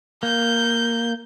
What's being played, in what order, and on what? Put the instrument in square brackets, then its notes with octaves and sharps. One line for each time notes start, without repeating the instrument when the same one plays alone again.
[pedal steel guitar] A#3 [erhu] G6